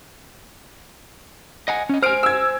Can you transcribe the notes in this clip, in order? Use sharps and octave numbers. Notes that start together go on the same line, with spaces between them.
D#5 F#5 G#5
C#4 D#5
C5 G#5 F6 D7
E6 G#6